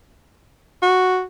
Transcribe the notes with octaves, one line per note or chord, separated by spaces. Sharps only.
F#4